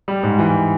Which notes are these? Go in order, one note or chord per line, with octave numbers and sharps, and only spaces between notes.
G3
G#2
E3